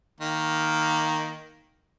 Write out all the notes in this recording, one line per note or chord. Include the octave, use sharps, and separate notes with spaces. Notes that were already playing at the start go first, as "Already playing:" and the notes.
D#3 A#3